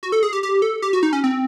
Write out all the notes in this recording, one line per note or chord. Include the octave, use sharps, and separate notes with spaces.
F#4
A4
G#4
G4
G4
A4
G4
F#4
D#4
C#4
C4